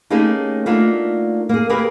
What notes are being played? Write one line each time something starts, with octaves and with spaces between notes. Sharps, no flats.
A3 A#3 C#4 D#4 G4 G#4
A3 A#3 D4 D#4 F4 F#4
A#3 G#4
A#3 G4 G#4 A#4 B4